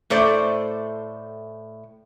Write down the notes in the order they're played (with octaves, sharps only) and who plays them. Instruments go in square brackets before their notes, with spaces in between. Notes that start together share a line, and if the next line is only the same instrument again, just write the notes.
[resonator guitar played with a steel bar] A2 A3 A4 C5 D5